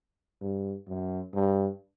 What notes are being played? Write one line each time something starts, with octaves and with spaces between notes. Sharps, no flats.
G2
F#2
G2